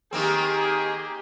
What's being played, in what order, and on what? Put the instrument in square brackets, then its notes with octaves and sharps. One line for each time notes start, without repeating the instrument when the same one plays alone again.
[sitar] D#3 A#3 C4 [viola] G4 [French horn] G#4